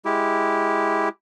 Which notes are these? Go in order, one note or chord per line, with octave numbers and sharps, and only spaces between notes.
G#3 E4 G4